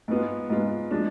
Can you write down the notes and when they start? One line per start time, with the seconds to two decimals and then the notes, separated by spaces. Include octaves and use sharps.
0.08 G#2 G#3 B3 F4
0.50 G#2 G#3 B3 F4
0.91 F3 G#3 D4